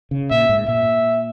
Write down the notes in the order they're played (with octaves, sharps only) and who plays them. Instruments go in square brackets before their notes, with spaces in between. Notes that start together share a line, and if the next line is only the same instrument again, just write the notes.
[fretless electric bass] C#3
[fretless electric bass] A#2 [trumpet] E5
[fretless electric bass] G#2
[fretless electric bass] A#2 [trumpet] E5